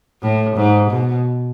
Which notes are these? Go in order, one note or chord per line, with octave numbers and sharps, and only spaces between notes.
A2
G#2
B2